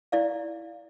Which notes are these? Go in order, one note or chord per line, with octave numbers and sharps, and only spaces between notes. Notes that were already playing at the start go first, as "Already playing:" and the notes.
E4 D5 F5